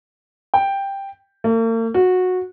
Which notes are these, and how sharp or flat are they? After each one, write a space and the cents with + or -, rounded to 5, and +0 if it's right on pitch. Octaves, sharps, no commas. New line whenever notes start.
G5 +5
A#3 -45
F#4 -15